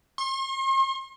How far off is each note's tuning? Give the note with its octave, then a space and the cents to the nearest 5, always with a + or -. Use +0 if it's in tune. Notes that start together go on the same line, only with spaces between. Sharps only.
C6 +45